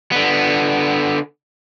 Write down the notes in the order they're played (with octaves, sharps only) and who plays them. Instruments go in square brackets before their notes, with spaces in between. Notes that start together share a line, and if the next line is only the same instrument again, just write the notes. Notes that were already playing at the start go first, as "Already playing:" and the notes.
[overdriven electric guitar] D3 B3